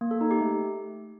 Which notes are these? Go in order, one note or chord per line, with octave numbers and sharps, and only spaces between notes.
A#3
A4
D#4
G4
A3